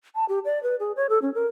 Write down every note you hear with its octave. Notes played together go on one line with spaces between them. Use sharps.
A5
G4
D5
B4
G#4
C#5
A4
C#4
A#4